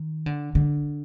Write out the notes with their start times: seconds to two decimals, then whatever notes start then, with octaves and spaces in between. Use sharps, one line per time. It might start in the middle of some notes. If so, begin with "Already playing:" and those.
Already playing: D#3
0.26 D3
0.55 D3